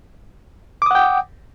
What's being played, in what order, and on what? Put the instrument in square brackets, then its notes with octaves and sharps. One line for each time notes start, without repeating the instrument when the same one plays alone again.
[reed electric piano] D6
D#6
F#5
G5